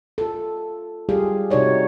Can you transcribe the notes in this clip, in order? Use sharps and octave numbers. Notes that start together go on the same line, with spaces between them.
F4 A4
G3 F4 G4 G#4 F5
C3 D#4 F#4 C#5 D5